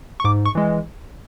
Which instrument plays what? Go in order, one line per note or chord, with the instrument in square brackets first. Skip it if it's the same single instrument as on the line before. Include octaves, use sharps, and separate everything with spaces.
[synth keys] C#6
G#2 D6
C#6
E3 G#3